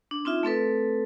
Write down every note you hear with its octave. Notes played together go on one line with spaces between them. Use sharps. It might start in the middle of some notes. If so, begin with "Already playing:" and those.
D4
C4 D#4 F4 E5
A3 C4 A4 B4